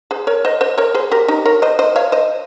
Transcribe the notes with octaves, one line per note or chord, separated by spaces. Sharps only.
G#4 C5
A#4 C#5
C5 D#5
C5 D#5
A#4 C#5
G#4 C5
G4 A#4
D#4 G4
A#4 C#5
C5 D#5
C5 D#5
C#5 F5
C5 D#5